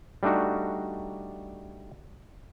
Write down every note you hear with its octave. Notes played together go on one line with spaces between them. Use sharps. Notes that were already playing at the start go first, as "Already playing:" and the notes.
G3 A3 D4 D#4 F#4